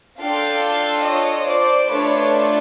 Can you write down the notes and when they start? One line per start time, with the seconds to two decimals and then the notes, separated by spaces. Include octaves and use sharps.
0.20 D4 F4 A4 F5 G5
1.04 C#5 D#5
1.46 C5 D5
1.88 A3 D4 F4 A4 B4 C#5